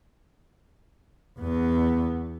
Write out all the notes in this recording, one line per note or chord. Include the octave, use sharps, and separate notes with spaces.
E2 B3